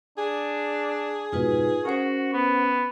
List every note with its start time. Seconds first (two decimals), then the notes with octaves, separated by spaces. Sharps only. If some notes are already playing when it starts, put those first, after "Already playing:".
0.18 D4 G#4
1.33 F2 G#2 B2 D#4 F4 B4
1.85 C#4 F#4 A#4 C5 F#5
2.33 B3